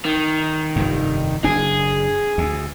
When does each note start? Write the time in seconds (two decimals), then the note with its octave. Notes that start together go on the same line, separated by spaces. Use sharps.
0.05 D#3
0.76 F1 G2
1.44 F#1 D4 G#4
2.38 D2